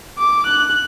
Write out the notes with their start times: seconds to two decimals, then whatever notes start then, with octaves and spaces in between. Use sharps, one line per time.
0.19 D6
0.47 F#6